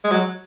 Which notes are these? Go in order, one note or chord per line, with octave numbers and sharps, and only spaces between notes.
G#3
F#3